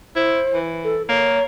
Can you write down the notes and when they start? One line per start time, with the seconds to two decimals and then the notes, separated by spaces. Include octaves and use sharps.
0.16 E4 C5
0.54 E3
0.84 A4
1.09 A#3 C#5